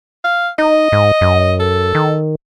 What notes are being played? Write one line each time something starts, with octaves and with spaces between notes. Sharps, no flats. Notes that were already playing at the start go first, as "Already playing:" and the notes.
F5
D#4 D#5
G#2
F#2
A4
D#3